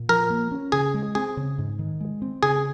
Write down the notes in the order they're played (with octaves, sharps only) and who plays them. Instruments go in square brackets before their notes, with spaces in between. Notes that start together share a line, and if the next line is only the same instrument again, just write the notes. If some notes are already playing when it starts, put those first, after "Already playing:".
Already playing: [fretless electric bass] A#2
[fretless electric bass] F3 [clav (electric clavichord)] A#4
[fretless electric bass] A#3
C#4
[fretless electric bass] C#3 [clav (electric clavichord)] G#4
[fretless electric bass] G#3
[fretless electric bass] C4 [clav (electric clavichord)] G#4
[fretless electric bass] C#3
G#2
D#3
G#3
C4
[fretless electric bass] C#3 [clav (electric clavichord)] G#4